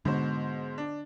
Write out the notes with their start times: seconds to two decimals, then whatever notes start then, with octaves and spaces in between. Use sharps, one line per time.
0.05 G#2 B2 D3 C5
0.78 D4